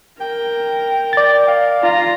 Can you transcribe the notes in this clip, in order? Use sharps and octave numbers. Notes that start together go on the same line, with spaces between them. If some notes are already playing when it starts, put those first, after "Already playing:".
A#4 G5
D5 A6
F5
F4 A#5